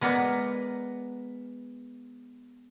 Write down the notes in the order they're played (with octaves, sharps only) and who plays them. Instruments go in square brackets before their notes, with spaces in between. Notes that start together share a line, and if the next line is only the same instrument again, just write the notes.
[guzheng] G#3 B3 A#4 B4 D5